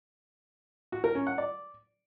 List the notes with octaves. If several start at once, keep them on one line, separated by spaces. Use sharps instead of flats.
F#4
A#4
C#4
F#5
D5